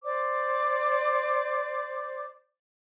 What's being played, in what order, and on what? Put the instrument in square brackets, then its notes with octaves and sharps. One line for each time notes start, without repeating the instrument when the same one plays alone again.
[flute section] C5 D5 D6